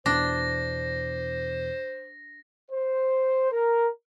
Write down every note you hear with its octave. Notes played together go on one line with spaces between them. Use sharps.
E2 B2 E3 D4 C5 A#6
C5
A#4